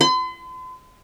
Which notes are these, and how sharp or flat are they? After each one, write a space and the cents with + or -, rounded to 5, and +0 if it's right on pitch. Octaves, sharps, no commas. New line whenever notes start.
C6 -45